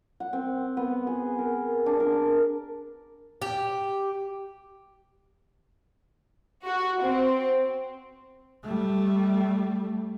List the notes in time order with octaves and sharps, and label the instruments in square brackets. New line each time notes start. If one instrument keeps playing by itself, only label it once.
[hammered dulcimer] F#5
C4
B3
G#4
A#4
D4
A#4
[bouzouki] G4
[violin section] F#4
C4
[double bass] G3 A3